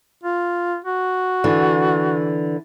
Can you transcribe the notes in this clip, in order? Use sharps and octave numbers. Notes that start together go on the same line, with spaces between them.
F4
F#4
D3 E3